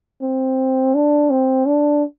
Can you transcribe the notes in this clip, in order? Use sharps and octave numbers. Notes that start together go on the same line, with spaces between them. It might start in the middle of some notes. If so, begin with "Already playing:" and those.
C4
D4
C4
D4